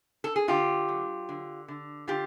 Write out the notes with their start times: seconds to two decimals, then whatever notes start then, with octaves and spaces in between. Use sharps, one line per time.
0.24 A4
0.36 G#4
0.48 D3 F4 G4
0.89 F#3
1.29 D3
1.68 D3
2.07 D3 F4 G4